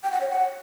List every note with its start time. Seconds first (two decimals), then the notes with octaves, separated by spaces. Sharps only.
0.04 G5
0.12 F#5
0.21 C#5
0.29 F#5